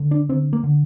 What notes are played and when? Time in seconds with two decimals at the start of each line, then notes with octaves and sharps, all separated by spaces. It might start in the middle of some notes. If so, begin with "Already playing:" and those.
Already playing: D3
0.11 D4
0.29 D3 C4
0.53 A#3
0.64 D3